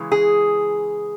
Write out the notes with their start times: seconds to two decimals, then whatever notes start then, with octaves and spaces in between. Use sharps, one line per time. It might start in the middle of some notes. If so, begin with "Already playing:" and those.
Already playing: C#3 E3 G#3
0.12 G#4